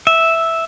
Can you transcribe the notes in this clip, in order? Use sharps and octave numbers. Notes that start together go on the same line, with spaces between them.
E5